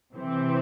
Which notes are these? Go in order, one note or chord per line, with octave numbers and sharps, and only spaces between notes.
C3 E3 C4